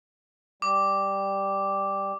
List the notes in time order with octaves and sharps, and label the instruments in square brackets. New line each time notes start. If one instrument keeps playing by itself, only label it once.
[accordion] G3 [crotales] D6